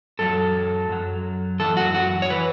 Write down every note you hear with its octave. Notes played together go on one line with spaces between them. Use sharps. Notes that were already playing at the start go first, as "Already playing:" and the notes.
F#2 F#3 A4
F#2 F#3
F#2 E3 A4
F#4
F#4
C#5
E3 B4